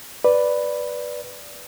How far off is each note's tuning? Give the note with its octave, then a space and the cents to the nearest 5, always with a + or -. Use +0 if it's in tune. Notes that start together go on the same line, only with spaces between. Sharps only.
B4 +0 D5 +0